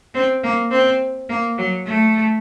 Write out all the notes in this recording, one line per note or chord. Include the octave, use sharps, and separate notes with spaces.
C4
A#3
C4
A#3
F#3
A3